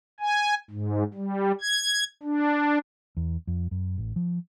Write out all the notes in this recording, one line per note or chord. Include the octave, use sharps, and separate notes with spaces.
G#5
G#2
G3
G#6
D4
E2
F2
F#2
A1
F3